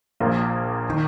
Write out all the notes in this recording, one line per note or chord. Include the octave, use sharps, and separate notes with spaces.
A#1 A#2 A#3
D#3